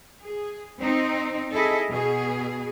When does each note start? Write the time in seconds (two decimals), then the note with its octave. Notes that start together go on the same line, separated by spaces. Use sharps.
0.23 G#4
0.80 C4 D#4
1.52 E4 G#4 A4 D#5
1.89 B2 G#4